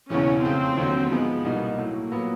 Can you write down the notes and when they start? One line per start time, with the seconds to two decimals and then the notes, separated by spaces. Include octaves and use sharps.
0.10 E1 E2 C#3 E3 C#4
0.43 F2 C#3 F3 A3 C4
0.77 D#2 D3 F#3
1.10 G#2 F3 G#3 B3
1.44 C2 B2 G3 A#3 D#4
1.78 A2 F#3 A3 A#3
2.11 A#2 F#3 B3